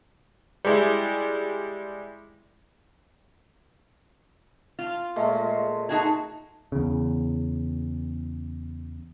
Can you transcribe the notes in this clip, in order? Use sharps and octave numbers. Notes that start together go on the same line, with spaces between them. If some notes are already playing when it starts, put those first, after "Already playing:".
G3 G#3 E4
F4
A#2 G#3 A3
D#4 F#4 G#4 A5
E2 C#3